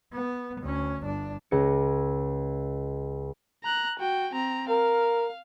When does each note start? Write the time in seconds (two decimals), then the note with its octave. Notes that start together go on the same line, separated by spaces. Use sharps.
0.13 B3
0.61 D2 C#4
1.03 G1 D4
1.51 C#2 A#6 C#7
3.63 A#5 F#6
3.99 F#4 G5
4.33 C4 A#5
4.70 A#4 F5